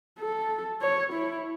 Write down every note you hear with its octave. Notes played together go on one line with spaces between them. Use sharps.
A4
C#5
E4